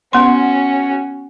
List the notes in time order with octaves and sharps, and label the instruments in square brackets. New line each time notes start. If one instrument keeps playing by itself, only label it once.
[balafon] B3 C6 [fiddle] C#4 F#4